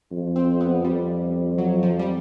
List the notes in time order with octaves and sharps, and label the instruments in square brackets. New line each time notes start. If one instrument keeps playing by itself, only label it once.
[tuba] F2
[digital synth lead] C4
B3
[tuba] F2 [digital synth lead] G3
[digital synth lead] F#3
F3
G3